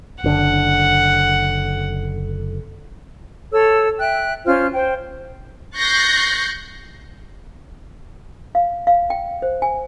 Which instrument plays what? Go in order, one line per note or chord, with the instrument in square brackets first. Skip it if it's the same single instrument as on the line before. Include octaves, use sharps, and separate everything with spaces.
[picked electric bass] F#1 D3 [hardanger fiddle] F#5
[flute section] A4 C#5 E6
E5 G5 F#6
C#4 F4 C5 F6
C5 G5
[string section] C#6 F#6 G6 A6 A#6 C7
[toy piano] F5
F5
G5
C5
G#5